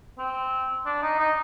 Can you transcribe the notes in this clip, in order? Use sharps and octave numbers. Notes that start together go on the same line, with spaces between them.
C4
D4
D#4
D#4